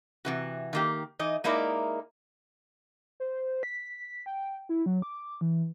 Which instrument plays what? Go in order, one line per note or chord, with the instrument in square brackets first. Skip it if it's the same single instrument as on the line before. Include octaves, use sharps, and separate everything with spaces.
[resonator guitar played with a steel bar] C3 E3 F#4
D#3 A#3 G4
E3 D#4 D#5
G#3 A#3 D#4 E4 A#4 D5
[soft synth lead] C5
B6
G5
E4
F#3
D6
E3